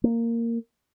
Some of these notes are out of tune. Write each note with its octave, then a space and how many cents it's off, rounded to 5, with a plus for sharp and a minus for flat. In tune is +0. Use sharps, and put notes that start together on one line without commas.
A#3 -10